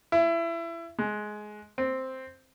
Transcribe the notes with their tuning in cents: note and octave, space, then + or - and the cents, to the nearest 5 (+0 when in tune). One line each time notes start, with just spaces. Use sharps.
E4 +25
G#3 +15
C4 +0